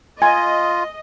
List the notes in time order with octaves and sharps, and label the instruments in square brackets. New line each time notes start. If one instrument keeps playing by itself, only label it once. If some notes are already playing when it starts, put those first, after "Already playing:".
[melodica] F4 [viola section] D#5 [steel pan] G#5